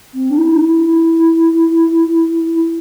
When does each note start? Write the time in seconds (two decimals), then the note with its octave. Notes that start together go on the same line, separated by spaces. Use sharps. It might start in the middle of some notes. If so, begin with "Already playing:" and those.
0.14 C4
0.30 D4
0.37 E4
0.54 D4
0.60 E4